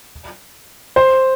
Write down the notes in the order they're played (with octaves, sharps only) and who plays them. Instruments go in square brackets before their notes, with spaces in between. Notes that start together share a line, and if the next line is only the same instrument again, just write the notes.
[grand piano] C5